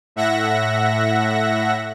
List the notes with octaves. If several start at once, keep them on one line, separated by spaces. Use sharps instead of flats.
A2 E5 F#5 A#6